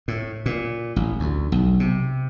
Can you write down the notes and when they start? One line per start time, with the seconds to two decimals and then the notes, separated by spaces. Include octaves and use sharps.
0.08 A2
0.46 A#2
0.96 A1
1.20 D2
1.52 B1
1.80 C3